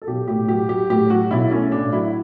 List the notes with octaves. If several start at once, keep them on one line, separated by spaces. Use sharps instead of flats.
A4
B1 G4
A2 G4
F#3 G4
F#3 G4
A2 G4
F#3 F#4
B1 E4
A3 C#4
A2 D4
F#3 E4